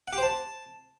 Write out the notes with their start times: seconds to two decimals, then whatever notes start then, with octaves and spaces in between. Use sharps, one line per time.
0.08 F#5
0.13 G4
0.18 C5
0.23 A5